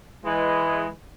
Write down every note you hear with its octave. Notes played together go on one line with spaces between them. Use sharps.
E3 G#3